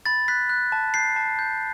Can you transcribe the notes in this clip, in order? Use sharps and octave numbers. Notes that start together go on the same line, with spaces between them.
B5 A6
F#6 B6
F#6
A5
G6 C7
A5
G6